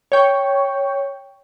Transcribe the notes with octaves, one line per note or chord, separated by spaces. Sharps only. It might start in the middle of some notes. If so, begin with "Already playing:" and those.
C#5 G5 C#6